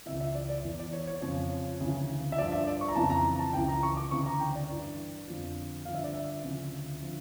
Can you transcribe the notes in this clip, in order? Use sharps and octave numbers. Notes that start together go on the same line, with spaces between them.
C#2 C#3 E3 E5
E5
D5
D5
E2 E3
D5
C#5
C#5
F2 C#3 F3 C#5
D2 C#3 E3
E5
G2 F3 D5
E5
D5
C#6
A#5
F2 C#3 E3 A5
A#5
A#5
A5
C#2 C#3 E3 G5
A#5
C#6
D6
D2 C#3 E3 C#6
A#5
G5
D5
G2 E3
F2 D3 F3
G2 D3 F3 F5
E5
D5
E5
D2 C#3 F3
D3 F3